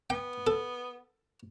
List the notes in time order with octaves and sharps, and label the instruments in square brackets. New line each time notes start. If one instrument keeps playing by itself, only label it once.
[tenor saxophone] B3 [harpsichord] G5
[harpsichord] A4